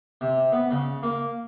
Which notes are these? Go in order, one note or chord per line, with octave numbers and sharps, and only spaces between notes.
C3
B3
C#3
A#3